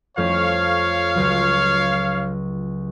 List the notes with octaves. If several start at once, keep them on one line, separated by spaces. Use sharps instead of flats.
F2 A3 C#4 C#5 F5
C#2 F#3